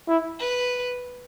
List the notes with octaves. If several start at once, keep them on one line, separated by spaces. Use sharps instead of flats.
E4
B4